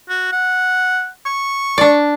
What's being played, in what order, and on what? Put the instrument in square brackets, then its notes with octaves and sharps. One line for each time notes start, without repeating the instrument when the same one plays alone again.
[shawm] F#4
F#5
C#6
[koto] D4 D5